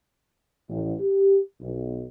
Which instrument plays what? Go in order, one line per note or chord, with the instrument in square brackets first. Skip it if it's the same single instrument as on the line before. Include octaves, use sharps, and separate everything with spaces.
[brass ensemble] A1
G4
B1